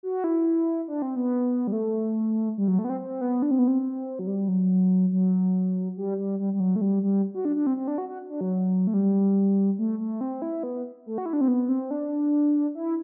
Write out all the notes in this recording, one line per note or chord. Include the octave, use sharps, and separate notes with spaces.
F#4
E4
D4
C4
B3
G3
A3
G3
F#3
A3
B3
C4
C4
B3
D4
C4
B3
C4
F#3
G3
F#3
F#3
G3
G3
G3
G3
F#3
A3
G3
G3
F#4
D4
D4
C4
C4
D4
F#4
F#4
D4
F#3
A3
G3
A3
A3
C4
E4
B3
A3
F#4
E4
D4
C4
B3
C4
D4
E4